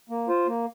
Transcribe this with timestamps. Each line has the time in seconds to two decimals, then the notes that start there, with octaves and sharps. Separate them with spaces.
0.10 A#3
0.29 F4 C5
0.47 A#3